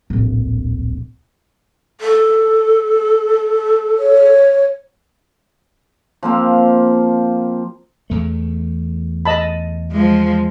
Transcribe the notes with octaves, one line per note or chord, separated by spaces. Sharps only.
D1 A#1
A4
C#5
F3 A#3 C4
E2 A3
D#5 A5 B5
F3 G#3